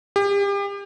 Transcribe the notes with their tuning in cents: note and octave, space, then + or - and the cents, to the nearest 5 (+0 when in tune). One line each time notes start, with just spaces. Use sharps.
G4 +35